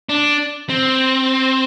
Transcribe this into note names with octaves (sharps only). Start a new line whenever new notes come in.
D4
C4